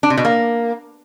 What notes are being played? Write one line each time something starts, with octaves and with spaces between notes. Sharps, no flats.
D4
C3
B2
A#3